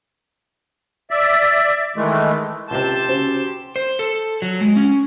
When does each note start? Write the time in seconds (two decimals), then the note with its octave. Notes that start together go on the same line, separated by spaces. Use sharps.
1.11 D5 E5
1.96 D#3 E3 G#3 A3
2.71 C#2 C3 G4 A5 C6 E6 G6
3.08 C#3 F#4 C5
3.76 C5
3.99 A4
4.42 F#3
4.61 G#3
4.76 C#4